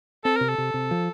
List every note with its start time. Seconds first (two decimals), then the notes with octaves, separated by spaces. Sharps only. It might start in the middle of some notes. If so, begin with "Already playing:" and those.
0.25 C4 A4
0.36 C3 A#4
0.49 A4
0.58 C3
0.74 C3
0.91 F3